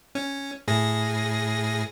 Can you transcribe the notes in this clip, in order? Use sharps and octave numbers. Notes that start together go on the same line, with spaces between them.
C#4
A2 G#4 A#6